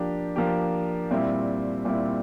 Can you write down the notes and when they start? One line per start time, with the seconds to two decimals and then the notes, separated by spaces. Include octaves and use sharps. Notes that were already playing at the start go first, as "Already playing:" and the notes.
Already playing: F3 A#3 D4 G4
0.36 F3 A#3 D4 G4
1.10 A#2 G3 C4 E4
1.85 A#2 G3 C4 E4